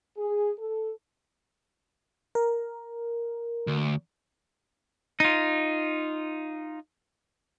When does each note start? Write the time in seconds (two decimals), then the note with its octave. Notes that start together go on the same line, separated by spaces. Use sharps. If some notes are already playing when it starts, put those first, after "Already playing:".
0.17 G#4
0.59 A4
2.35 A#4
3.67 D2
5.20 D#4 F4